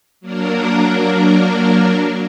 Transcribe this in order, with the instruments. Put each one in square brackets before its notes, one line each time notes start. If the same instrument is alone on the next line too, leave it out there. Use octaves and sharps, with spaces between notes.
[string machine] F#3 A#3 D4 A#4